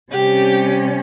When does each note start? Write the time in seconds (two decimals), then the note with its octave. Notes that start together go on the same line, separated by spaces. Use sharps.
0.11 C3 G3 C#4 G4